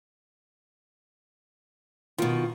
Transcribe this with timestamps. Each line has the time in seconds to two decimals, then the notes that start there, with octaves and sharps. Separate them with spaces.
2.18 B2 D#3 F4